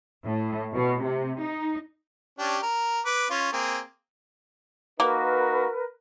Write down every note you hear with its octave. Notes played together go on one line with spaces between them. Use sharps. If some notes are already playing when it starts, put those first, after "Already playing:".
A2
B2
C3
D#4
C#4 D4 G4
A#4
B4 D6
C#4 F4
A#3 C4 G#4
A#3 D#4 F#4 A#4 B4